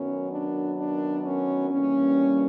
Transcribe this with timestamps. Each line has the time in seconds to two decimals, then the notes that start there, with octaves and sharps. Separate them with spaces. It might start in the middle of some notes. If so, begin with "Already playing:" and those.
Already playing: F#2 D#3 F#3 B3 C#4
0.32 D4
0.79 D4
1.25 C#4
1.70 G2 E3 G3 A#3 C#4